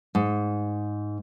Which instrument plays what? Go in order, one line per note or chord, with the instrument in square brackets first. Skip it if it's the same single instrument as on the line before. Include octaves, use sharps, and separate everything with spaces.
[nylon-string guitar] G#2